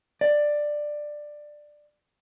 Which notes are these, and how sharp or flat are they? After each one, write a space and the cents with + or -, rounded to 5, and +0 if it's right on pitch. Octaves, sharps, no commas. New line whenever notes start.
D5 +10